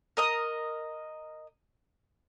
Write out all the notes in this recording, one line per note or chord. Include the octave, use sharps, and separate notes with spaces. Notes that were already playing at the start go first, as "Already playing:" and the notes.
A#4 D#5 D#6